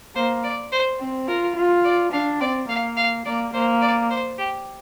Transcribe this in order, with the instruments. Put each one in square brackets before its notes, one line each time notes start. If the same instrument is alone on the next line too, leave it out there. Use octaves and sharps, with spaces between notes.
[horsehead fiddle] A#3 [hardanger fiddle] C5
[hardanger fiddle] D5
C5
[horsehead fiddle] C4
[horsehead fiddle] F4 [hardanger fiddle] A#4
[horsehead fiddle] F4
[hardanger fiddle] D5
[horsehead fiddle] D4 [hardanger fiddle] F5
[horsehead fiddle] C4 [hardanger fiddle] D5
[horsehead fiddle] A#3 [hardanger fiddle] F5
[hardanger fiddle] F5
[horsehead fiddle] A#3 [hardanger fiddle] D5
[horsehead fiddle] A#3 [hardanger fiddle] C5
[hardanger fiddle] D5
C5
G4